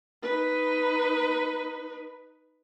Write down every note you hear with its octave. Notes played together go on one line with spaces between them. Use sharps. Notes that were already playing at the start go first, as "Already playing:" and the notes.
D#4 B4